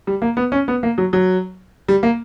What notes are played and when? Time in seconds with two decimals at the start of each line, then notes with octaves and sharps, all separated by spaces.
0.07 G3
0.22 A#3
0.37 B3
0.52 C#4
0.68 B3
0.83 A#3
0.98 F#3
1.13 F#3
1.88 G3
2.03 A#3